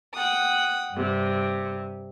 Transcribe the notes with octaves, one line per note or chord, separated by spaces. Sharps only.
F#5 G5 D#6
G2 C3